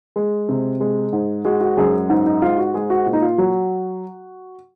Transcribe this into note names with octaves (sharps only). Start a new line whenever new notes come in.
G#3
C3
G#3
G#2
G#3 F#4
F#4
F#2 G#4
G#2 D#4
D#4
G#2 F4
F#4
G#3 G#4
F#4
A#2
D#4
F4
F#3 F#4